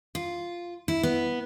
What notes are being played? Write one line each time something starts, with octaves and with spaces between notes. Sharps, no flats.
F4
E4
B3